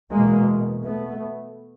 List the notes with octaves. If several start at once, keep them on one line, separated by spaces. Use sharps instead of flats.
E2 B2 G#3 A#3
A3 B3